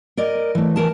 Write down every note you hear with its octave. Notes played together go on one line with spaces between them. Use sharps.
A#4 D5 D#5
E3 A3
E3 A#4 A5